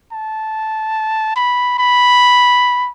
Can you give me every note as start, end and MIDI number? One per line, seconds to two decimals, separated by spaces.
0.12 1.32 81
1.36 1.78 83
1.78 2.90 83